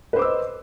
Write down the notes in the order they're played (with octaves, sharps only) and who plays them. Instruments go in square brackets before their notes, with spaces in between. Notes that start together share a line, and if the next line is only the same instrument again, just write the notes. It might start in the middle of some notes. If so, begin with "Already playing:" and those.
[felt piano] B4
C5
D6
E6
D#5